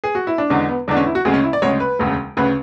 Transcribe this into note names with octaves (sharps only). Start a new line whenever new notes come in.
G#4
F#4
E4
D4
E2 D3 G#3 C#4
B3
E2 D3 G#3 D4
C#4
E4
F#4
D2 C#3 G#3 G#4
C#4
E4
D5
D2 C#3 G#3 C#5
B4
E1 D2 C#3
D2 C#3 B4